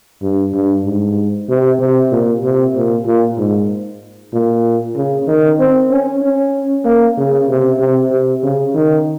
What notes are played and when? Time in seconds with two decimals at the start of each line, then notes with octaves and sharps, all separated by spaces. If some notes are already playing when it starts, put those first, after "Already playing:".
0.22 G2
0.54 G2
0.86 G#2
1.49 C3
1.80 C3
2.12 A#2
2.44 C3
2.75 A#2
3.07 A#2
3.38 G#2
4.33 A#2
4.96 C#3
5.28 D#3
5.60 C4
5.91 C#4
6.23 C#4
6.85 A#3
7.18 C#3
7.49 C3
7.80 C3
8.12 C3
8.43 C#3
8.75 D#3